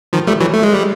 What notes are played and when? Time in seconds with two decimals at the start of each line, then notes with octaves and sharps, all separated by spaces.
0.13 D#3 F3
0.27 G3 A3
0.40 E3 F#3
0.54 A3
0.63 G#3
0.73 G3